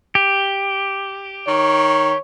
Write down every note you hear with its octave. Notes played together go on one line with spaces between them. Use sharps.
G4
D#3 C#5